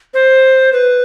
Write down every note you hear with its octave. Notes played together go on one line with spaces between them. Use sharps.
C5
B4